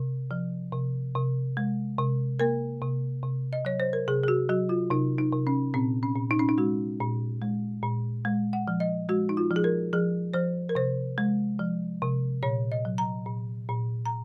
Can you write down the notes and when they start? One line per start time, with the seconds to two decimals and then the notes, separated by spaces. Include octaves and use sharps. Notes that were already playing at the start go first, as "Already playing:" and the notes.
Already playing: C3
0.31 F3
0.73 C3
1.15 C3
1.57 G#3
1.99 C3
2.40 A#3 A#4
2.82 C3
3.23 C3
3.53 D#5
3.65 F#3 C#5
3.80 C5
3.93 A#4
4.08 C3 G#4
4.24 G#4
4.28 F#4
4.49 F#3 F#4
4.69 F4
4.90 C3 D#4
5.19 D#4
5.32 C3
5.47 C#4
5.74 A#2 C4
6.03 C#4
6.16 A#2
6.31 D#4
6.39 C#4
6.49 D#4
6.58 G#3 F#4
7.00 A#2
7.42 G#3
7.83 A#2
8.25 G#3
8.53 F#5
8.68 F3
8.80 D#5
9.09 G#3 F#4
9.29 D#4
9.37 F4
9.51 F3
9.56 G#4
9.64 A#4
9.93 F3 G#4
10.34 F3 C5
10.69 A#4
10.75 C3 C5
11.18 G#3
11.59 F3
12.02 C3
12.43 A#2 C#5
12.72 D#5
12.85 F#3
12.98 A#5
13.26 A#2
13.69 A#2
14.06 A#5